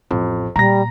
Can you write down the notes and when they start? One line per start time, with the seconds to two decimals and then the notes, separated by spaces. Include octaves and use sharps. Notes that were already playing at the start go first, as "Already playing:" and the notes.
0.11 A1 F2
0.56 A#2 G3 A#5 A#6